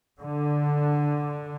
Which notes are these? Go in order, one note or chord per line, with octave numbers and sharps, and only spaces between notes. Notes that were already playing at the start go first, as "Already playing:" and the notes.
D3